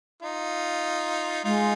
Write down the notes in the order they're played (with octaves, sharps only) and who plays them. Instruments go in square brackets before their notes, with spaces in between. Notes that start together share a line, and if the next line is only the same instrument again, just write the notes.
[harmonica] D#4 F4
[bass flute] G#3 [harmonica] D#4 F4